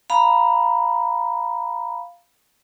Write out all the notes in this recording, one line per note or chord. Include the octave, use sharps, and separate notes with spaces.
F5 A#5 B5